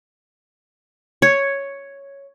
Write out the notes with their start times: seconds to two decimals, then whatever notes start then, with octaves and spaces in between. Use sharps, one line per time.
1.22 C#5